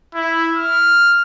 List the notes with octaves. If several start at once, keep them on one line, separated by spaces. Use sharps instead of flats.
E4
F6